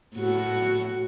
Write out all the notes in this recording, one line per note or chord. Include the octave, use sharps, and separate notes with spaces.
A2 F#4